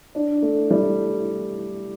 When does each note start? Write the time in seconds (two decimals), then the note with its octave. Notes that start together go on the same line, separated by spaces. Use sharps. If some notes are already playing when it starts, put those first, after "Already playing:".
0.15 D4
0.42 A3
0.71 G3